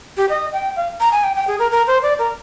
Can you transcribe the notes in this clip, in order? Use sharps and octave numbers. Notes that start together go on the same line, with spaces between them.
G4
D#5
G5
F5
A#5
G#5
G5
G5
G#4
A#4
A#4
C5
D5
A#4